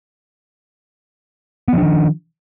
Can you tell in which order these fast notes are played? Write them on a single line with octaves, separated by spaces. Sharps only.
B3 F3 D4 D#3